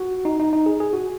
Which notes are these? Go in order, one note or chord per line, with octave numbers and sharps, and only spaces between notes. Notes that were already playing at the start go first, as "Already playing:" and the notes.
Already playing: F#4
D#4
D#4
D#4
G#4
G#4
F#4